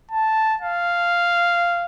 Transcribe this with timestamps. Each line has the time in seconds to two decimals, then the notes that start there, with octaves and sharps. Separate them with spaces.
0.11 A5
0.61 F5